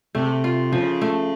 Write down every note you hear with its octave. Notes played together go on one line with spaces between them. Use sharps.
C3 A3
F4
C#3 F3
A3